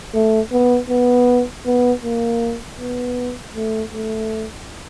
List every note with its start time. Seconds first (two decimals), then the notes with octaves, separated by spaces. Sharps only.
0.14 A3
0.52 B3
0.90 B3
1.66 B3
2.04 A#3
2.80 B3
3.56 A3
3.94 A3